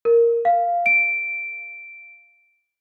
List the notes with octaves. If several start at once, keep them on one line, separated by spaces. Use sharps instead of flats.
A#4
F5
D7